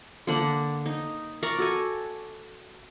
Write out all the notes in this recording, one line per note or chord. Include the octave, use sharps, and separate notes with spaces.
D3 A#3 D4 F#5
D#4
A#4 D5 A#5 C#6
F#4 A4 G#5